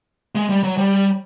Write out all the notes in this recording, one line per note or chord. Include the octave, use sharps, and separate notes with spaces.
G#3
G3
F#3
G3